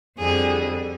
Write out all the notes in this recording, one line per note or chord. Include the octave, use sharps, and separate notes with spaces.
F2 D3 G3 G#4